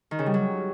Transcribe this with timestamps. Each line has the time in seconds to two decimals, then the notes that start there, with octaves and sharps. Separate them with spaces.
0.11 D#3
0.19 C#3
0.26 G3
0.34 F#3